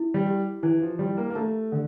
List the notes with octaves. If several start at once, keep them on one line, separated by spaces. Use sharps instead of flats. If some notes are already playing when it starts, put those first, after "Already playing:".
Already playing: E4
G3
G4
E3 E4
F3
G3 G4
A#3
A#3
A3 A5
D3